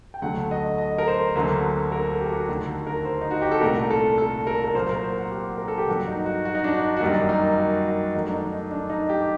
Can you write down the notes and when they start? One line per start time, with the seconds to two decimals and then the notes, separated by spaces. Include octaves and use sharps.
0.14 G5
0.22 D2 D3 F#3 A3 F#5
0.51 D#5
0.78 D#5
0.98 A#4
1.08 C5
1.35 D2 D3 F#3 A#3
1.92 A#4
2.12 A4
2.20 G4
2.30 F#4
2.48 D#2 D3 A3 F#4
2.87 A#4
3.05 C5
3.21 D#4
3.31 F#4
3.42 G4
3.51 A4
3.61 C2 A#2 A3 A#4
3.91 A4
4.18 A4
4.47 A#4
4.64 A#4
4.75 A#2 F#3 A#3 C5
4.89 A#4
5.03 C5
5.18 F#5
5.31 G4
5.58 A#4
5.68 A4
5.78 G4
5.88 G2 F#3 A#3 F#4
6.07 D#4
6.26 F#4
6.45 F#4
6.55 D#4
6.64 D4
6.75 D#4
6.97 F#4
7.01 F#2 D#3 G3 A#3 D#4
7.29 D#4
7.58 F#4
7.87 F#4
8.14 F#2 D#3 F#3 A3 D#4
8.28 D4
8.33 D#4
8.53 D#4
8.71 D4
8.90 D#4
9.09 G4